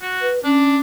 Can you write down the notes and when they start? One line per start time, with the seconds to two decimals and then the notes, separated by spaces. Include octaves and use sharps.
0.01 F#4
0.21 B4
0.44 C#4 D4